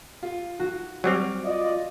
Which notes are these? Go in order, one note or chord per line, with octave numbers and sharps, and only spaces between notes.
F4
F#4
F#3 G3 C4 C#6 D6 F6
F4 D5 D#5